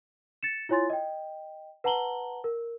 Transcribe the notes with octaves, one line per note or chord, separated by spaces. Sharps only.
A6 C#7 E7
E4 F4 C#5 G#5 C6 A6
D#5 G5
B4 F#5 A5 A#5 F#7 G7
A#4